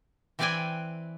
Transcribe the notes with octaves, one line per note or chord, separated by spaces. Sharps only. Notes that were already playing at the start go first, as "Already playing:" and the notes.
E3 C4 B4 D5 G5 G#5